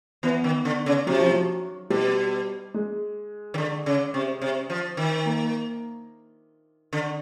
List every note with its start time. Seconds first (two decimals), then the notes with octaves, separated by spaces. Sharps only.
0.23 E3 B3
0.44 D#3
0.65 D3
0.86 C#3
1.07 C3 F#3
1.19 F3
1.31 F#3
1.90 B2 G3
2.74 G#3
3.54 D#3
3.58 D3
3.86 C#3
4.14 C3
4.41 C3
4.70 F3
4.97 D#3
5.26 A#3
6.93 D3